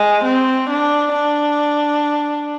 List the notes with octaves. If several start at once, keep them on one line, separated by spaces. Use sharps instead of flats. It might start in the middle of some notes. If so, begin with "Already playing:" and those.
Already playing: G#3
C4
D4
D4